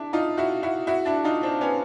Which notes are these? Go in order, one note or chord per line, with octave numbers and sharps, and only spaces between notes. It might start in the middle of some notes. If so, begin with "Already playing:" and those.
Already playing: D4 E4
D#4 F4
E4 F#4
E4 F#4
E4 F#4
D4 E4
D#4 F4
C4 D4
B3 C#4